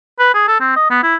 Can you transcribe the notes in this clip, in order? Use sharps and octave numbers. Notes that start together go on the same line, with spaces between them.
B4
G#4
A4
C4
D#5
B3
E4